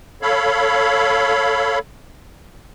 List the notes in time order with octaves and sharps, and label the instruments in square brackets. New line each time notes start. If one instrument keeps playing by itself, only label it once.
[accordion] A4 C#5 F5 B5